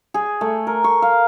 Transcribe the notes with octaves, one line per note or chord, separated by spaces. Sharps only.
G#4
A3
A#4
C#6
F5